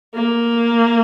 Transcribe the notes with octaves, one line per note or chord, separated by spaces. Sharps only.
A#3